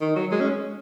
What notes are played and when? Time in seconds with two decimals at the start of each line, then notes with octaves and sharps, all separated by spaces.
0.01 D#3
0.16 F#3
0.31 G#3
0.41 C#4